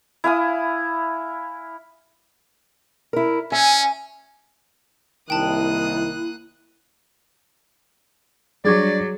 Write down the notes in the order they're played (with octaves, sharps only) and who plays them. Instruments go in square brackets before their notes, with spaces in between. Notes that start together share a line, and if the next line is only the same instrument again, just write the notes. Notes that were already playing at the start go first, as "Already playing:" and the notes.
[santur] E4 F5 G#5 D#6
[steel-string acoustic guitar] E4 A#4
[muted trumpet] C#4 [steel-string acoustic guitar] E5 [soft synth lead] G#5
[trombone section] C2 D#3 [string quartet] A#3 D#6 F#6 [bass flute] E4 [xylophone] G5 A5
[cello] F#3 [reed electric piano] G3 D4 C#6 [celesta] G#4 D6 G#6 [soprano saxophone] D5